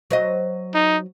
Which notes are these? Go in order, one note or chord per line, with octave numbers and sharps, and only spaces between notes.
F#3 C5 D#5
D#4